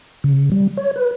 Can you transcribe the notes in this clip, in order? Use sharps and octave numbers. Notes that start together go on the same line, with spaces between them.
C#3
G3
C#5
B4